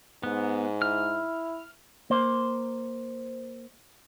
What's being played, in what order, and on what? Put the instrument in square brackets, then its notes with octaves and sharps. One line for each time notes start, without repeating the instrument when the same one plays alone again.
[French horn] G#2 [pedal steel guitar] B3
[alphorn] E4 [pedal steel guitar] F6
[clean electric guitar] A#3 C5